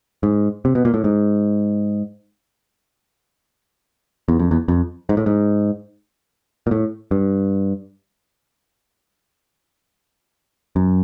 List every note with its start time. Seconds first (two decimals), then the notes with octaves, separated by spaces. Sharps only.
0.23 G#2
0.65 C3
0.75 B2
0.85 A#2
0.94 A2
1.04 G#2
4.28 E2
4.39 F2
4.51 E2
4.68 F2
5.09 G#2
5.17 A2
5.26 G#2
6.67 A#2
6.71 A2
7.11 G2
10.76 F#2